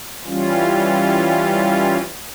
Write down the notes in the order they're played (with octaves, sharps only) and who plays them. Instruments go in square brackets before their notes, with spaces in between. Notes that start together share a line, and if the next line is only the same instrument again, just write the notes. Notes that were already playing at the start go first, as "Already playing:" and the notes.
[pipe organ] E3 G3 C#4 F4